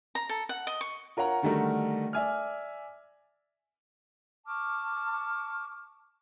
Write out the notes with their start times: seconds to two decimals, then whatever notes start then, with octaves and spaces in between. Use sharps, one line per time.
0.15 A#5
0.29 A4
0.49 F#5
0.67 D#5
0.81 C#6
1.17 F4 A#4 C#5 F#5 A#5
1.42 D3 D#3 G3 A3 F#4 A#4
2.13 D5 E5 G#5 F6
4.47 A5 C#6 D6 F6